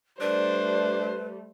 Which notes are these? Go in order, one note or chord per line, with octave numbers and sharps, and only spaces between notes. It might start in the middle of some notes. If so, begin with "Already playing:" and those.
G3 A3 D4 B4 C5